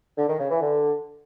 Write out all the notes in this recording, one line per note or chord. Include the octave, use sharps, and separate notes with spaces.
D3
D#3
C#3
E3
D3